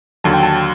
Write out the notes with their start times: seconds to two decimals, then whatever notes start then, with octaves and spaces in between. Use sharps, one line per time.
0.24 D#2 D3 F#3 A5
0.33 G5
0.43 A5